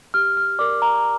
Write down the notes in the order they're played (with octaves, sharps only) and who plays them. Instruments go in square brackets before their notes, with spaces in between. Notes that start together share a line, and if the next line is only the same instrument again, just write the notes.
[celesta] G4 F6
F6
A#4 D5 D6
A#5